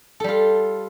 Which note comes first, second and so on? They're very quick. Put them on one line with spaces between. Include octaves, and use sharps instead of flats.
A4 G3 F4